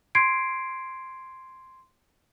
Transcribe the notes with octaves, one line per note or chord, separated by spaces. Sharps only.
C6 G#6 C7 D7